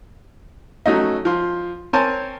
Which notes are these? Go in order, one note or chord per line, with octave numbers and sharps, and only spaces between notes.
F#3 A3 C#4 D#4
F3 C6
C4 A#4 C5 C#5 G#5 A5